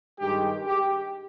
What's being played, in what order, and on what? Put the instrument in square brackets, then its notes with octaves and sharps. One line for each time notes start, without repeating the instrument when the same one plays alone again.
[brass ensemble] G2 D#3 G#3 G4
G4